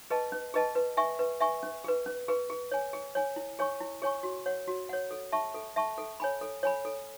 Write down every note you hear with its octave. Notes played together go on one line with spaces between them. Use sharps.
G#4 B4 D#5 A5
C#4
G#4 B4 D#5 A5
B4
E5 G#5 C#6
B4
E5 G#5 C#6
C#4
G#4 B4
C#4
G#4 B4
G#4
C#5 G#5
G#4
C#5 G#5
E4
G#4 C#5 G#5 C#6
E4
G#4 C#5 G#5 C#6
F#4
C#5 F#5
F#4
C#5 F#5
A4
E5 A5 C#6
A4
E5 A5 C#6
A4
C#5 G#5 B5
A4
C#5 G#5 B5
A4